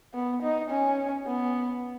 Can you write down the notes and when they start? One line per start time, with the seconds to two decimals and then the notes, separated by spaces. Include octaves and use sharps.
0.14 B3
0.42 D#4
0.70 C#4
1.27 B3